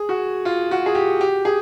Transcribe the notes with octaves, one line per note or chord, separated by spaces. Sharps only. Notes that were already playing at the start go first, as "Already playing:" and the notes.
Already playing: G#4
F#4
F4
F#4
G#4
G4
G4
G#4